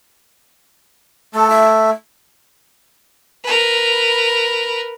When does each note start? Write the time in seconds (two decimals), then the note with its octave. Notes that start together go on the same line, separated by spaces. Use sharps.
1.35 A3 A5
1.50 E5
3.43 A#4 B4